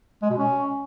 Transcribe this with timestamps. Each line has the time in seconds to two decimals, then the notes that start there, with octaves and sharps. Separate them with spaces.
0.22 G#3
0.30 B2
0.38 C#4